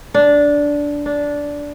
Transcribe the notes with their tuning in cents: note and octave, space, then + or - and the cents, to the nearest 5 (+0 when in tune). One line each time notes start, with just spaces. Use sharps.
D4 -10
D4 -10